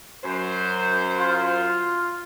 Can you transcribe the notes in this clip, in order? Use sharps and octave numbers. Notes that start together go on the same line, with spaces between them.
F#2 C5
F4